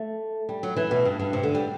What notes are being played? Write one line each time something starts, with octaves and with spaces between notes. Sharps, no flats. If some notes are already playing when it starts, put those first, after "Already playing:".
Already playing: A3
G3
F#3
E3
B2
G2
G2
C3
D3
G3